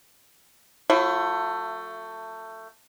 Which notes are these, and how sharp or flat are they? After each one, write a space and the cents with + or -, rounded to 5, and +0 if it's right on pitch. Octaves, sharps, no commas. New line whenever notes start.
F#3 -40 A3 +20 E4 +30